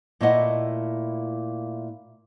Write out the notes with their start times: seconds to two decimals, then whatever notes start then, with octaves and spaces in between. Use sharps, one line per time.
0.21 A#2 A3 A#3 E4 D#5 F#5